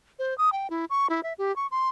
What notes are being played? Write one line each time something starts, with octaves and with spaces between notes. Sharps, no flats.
C5
D#6
G5
E4
C#6
E4
E5
G4
C#6
C6